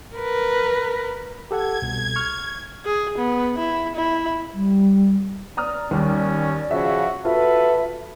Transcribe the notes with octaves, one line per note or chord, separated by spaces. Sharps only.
A#4 B4
G4 A4 F#5 G#6
C2 B2
C#6 F6
G#4
B3
E4
E4
G3
D5 A#5 D#6 F6
D#2 G3 C#4
C#3 F3 F#4 E5
F4 F#4 A4 B4 E5